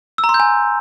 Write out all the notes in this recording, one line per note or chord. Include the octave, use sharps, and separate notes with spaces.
E6
A#5
C6
G6
G#5